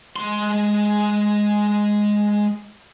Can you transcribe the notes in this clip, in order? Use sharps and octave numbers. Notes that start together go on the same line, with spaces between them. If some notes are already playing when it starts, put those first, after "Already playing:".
G#3 C6